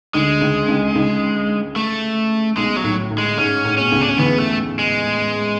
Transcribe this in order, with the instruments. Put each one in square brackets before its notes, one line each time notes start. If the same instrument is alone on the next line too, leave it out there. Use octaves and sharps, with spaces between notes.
[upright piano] D2 D3 [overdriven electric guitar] G#3
[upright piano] C#2 C#3
C#2 C#3
C#2 C#3
[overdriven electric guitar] A3
[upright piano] B1 B2 [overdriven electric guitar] G#3
[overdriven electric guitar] F#3
[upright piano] A2
A2
[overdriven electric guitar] G#3
[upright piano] G#2 [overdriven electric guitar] C#4
[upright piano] A2
[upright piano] B2 [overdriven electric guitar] C#4
[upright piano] C#2 C#3
[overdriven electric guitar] D4
C#4
[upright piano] E2 E3 [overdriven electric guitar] B3
[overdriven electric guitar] A3
G#3